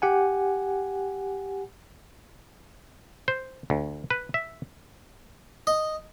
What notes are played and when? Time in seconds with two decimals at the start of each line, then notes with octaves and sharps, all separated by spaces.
0.02 G4 F#5 G#5
3.28 C5
3.70 D2
4.10 B4
4.34 E5
5.67 D#5